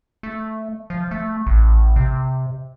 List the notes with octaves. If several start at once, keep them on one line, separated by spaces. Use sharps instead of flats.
A3
F3
A3
A1
C3